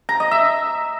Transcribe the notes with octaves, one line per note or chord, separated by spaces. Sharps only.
A#5
D#5
E5